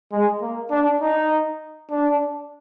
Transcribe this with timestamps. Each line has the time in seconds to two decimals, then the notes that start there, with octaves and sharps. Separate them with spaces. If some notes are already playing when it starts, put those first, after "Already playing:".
0.12 G#3
0.41 A#3
0.71 D4
1.01 D#4
1.90 D4